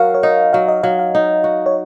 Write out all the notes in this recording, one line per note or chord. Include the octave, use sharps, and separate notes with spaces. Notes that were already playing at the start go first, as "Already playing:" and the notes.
Already playing: F#3 F#4 A#4 F5
C#5
D#4 D#5
F#3 F5
D#5
F#3 F5
F5
D#4
F#4
C#5